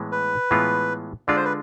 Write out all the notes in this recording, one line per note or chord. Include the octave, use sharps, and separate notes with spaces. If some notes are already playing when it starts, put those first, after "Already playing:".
Already playing: A2 E3 G#3 B3
B4
A2 E3 G#3 B3 F4
D3 G#3 D4 F4 D5
C5
B4